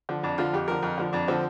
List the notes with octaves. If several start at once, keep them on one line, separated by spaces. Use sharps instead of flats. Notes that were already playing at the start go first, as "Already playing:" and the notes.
D3 F3
F2 D4
D3 F3 F4
F2 G4
D3 F3 A#4
F2
D3 F3
F2 D4
D3 F3 C4